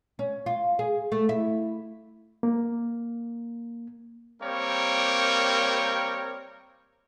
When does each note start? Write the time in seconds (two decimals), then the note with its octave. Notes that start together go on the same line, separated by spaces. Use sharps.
0.19 C#4
0.46 F4
0.79 G#4
1.12 A3
1.29 E4
2.43 A#3
4.42 G3 A#3 C4 A#4 C#5 G5